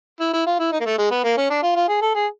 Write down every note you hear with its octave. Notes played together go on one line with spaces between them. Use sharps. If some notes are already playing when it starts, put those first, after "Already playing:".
E4
E4
F4
E4
D#4
A#3
A3
G#3
B3
A#3
C#4
D4
F4
F4
G#4
A4
G#4